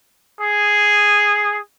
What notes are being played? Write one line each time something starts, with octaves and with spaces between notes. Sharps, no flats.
G#4